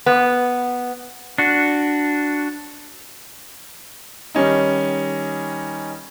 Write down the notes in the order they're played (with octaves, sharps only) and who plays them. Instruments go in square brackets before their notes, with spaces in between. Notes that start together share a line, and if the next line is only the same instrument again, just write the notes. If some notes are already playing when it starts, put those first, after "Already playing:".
[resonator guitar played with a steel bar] B3
[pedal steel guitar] D4 F#4
[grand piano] D#3 G3 C#4 D#4